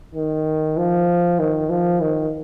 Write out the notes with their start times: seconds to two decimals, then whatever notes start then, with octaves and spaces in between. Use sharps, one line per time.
0.15 D#3
0.77 F3
1.39 D#3
1.70 F3
2.01 D#3